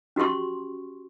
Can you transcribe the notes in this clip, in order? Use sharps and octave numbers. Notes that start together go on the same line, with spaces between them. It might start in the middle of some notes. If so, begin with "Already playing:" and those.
C#4 F#4 G4 C6 C#6